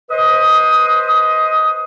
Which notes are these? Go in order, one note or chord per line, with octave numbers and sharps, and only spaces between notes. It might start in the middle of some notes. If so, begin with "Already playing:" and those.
B4 C5 D#5 D#6